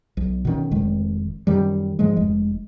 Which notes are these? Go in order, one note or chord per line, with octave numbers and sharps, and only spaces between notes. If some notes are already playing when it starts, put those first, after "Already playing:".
B1
B2 D#3 C#4
F1 D#3 G#3
F#2 D#3 G3
G#2 F3 G#3
F1 G#3